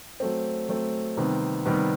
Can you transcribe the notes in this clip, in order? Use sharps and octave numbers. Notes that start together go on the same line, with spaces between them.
F#3 A3 C4
F#3 A3 C4
C3 D#3 G3 B3
C3 D#3 G3 B3